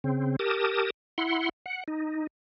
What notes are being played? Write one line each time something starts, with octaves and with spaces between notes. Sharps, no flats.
C#3 C4
G4 A#4 A5 D#6
E4 F#5 C6
F#5
D#4